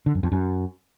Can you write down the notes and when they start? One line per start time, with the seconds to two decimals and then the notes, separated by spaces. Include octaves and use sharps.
0.06 D3
0.15 F#2
0.23 F2
0.32 F#2